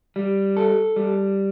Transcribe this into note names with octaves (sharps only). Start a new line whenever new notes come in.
G3
A4
G3